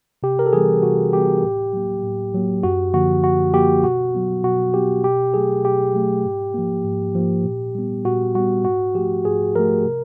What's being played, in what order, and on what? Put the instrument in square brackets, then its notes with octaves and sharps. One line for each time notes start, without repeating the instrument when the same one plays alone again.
[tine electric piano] C3 G4
A#4
A4
E3 G3 B3 G#4
C3 F#4
E3 G3 B3 G4
A2
F#3 A#3
A2
F#3 A#3
F#2 F#4
D3 F3 A#3 F#4
F#2 F#4
D3 F3 A#3 G4
B2 F#4
F#3 B3
B2 F#4
F#3 B3 G4
B2 G4
F#3 A3 G#4
B2 G4
F#3 A3
G#2
F3 A#3
G#2
F3 A#3
A#2
G3 B3
A#2 F#4
G3 B3 F#4
G#2 F#4
F3 A3 G4
G#2 G#4
F3 A3 A#4
C3